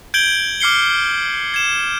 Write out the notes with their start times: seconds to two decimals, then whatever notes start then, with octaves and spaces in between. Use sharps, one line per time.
0.14 G6 G#6 D7 F#7 G7
0.60 D6 F6 C7 C#7 G7
1.54 G#6 E7